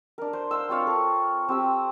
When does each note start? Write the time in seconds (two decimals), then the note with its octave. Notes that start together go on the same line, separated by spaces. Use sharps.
0.18 D4 A#4
0.33 C5
0.51 C5 F5 C6 E6
0.69 C4 F4 C#5 F5
0.87 A4
1.49 C4 G4 E6